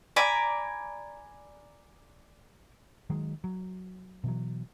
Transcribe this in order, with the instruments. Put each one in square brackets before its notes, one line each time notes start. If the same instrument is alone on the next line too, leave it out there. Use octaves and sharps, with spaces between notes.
[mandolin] D5 G#5 A#5 B5
[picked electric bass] D#3 F#3 G#3
F#3
B2 E3 F#3